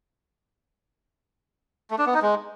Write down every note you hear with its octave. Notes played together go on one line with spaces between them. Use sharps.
A3
D4
B3
D#4
G#3